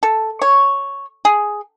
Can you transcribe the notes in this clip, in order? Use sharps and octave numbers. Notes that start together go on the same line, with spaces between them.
A4
C#5
G#4